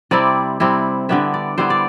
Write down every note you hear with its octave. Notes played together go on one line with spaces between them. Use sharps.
C3 G3 C4 E4 D5
C3 G3 C4 E4
D3 G3 B3 E4 E5
D5
D3 G3 B3 E4 C5
D5